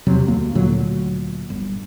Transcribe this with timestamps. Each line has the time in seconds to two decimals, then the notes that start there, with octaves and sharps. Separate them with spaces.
0.06 E1 E2 C3 F#3
0.28 D2 A#3
0.55 D2 A#2 D3 F#3
1.50 G1